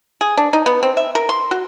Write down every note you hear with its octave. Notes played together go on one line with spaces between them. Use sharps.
G#4
D4
D#4
B3
C4
E5
A#4
C6
F#4